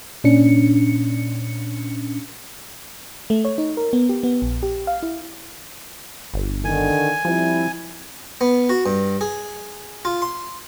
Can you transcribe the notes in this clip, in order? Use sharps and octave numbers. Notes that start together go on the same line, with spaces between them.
A#2 C#4 D4 C#7
A3
C#5
D#4
A#4
B3
G4
B3
A#1
G4
F5
E4
G1
D3 D#3 G#5
F3 G3 C4 E4
B3
F#4
G2
G#4
F4
C6